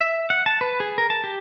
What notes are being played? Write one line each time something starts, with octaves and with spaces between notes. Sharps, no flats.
E5
F#5
A5
B4
G#4
A#4
A5
G4